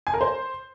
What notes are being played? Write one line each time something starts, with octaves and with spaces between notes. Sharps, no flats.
G#5
A#4
C5